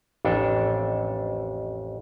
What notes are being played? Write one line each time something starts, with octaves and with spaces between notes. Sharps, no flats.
A1 F2 D4 A4